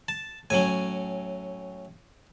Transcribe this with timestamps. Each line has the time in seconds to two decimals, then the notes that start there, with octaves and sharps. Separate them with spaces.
0.08 A5
0.50 A2 F#3 C#4 G#5